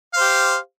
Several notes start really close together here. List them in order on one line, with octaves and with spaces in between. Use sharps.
F5 C5 G4